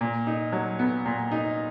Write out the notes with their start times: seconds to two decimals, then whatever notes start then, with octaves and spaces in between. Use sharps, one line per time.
0.01 A#2
0.27 D#4
0.53 F#3
0.79 B3
1.05 A#2
1.31 D#4